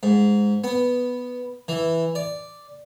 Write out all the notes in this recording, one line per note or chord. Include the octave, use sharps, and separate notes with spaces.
G#2
B3
E3
D5